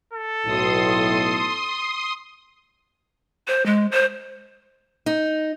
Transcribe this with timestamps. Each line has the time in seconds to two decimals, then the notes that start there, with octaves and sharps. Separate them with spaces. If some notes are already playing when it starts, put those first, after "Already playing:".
0.13 A4
0.46 B1 A2 C6 D#6
3.48 C5
3.66 G#3
3.92 C5
5.06 D#4